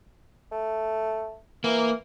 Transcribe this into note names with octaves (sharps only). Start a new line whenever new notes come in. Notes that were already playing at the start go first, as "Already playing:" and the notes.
A3
E3 A#3